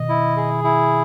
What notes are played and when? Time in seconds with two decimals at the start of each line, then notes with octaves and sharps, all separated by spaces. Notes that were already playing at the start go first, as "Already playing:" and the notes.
Already playing: B2 D#3 D#5
0.09 E4
0.36 G#4
0.64 E4